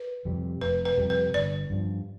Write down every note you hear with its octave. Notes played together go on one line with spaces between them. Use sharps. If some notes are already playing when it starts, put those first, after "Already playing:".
Already playing: B4
F2 C3 G3
F1 B4
B4
F2 C3 G3
B4
G1 D5
G2 F3